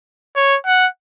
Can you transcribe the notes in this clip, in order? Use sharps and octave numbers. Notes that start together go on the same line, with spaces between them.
C#5
F#5